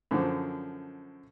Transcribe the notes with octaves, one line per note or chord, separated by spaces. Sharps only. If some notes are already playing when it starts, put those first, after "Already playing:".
F#2 D3 F3